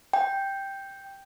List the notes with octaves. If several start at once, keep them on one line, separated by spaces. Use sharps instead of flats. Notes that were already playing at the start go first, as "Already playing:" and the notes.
G5